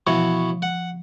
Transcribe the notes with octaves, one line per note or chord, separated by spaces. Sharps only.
B2 E3 F3 C#5
F#5